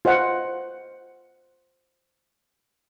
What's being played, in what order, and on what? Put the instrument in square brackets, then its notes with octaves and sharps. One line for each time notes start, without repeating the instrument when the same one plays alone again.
[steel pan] F4 C5 D#5 F#5